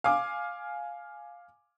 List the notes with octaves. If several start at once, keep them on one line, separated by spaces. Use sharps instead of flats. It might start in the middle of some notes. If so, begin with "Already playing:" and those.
F5 G#5 D6